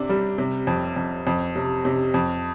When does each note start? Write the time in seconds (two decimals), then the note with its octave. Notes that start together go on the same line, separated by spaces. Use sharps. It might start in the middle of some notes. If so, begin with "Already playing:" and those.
Already playing: C3 D4
0.09 G3
0.38 C3
0.67 F2
0.96 F2
1.27 F2
1.56 C3
1.85 C3
2.14 F2